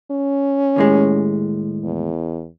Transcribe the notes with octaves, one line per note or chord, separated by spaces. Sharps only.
C#4
D#2 A2 G#3
E2